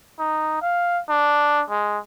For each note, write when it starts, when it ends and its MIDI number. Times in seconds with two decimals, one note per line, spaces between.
0.19 0.58 63
0.62 1.01 77
1.09 1.63 62
1.70 1.98 56